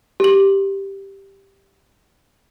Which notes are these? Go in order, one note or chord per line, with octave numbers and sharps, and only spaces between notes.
G4 F#7